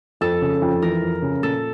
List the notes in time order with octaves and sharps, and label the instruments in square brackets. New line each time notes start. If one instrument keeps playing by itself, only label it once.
[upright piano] F2 [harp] A4
[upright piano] C#3
F2
[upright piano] E3 [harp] A#4
[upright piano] F2
C#3
[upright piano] A#2 [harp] A4